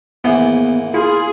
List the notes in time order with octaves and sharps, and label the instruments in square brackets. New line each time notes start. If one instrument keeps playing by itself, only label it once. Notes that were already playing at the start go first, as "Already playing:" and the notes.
[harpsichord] D#2 G#2 E3 [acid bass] B3
[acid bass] E4 [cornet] F4 [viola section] G#4